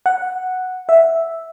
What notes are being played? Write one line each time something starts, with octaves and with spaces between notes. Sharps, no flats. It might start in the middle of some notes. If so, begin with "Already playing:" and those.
F#5
E5